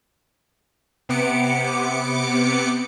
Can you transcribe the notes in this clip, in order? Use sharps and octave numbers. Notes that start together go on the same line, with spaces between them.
C3 B3 D6 C#7